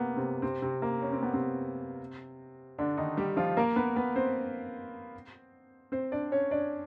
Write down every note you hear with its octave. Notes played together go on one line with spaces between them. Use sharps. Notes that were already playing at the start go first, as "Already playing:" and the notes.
Already playing: C3 A#3 B3
C3 C4
C3 C4
C3 C4
A#3
C#4
C4
B3
C3 C4
D3 D4
D#3 D#4
G3 G4
F3 F4
A#3 A#4
B3 B4
B3 B4
C4 C5
C4 C5
D4 D5
C#4 C#5
D4 D5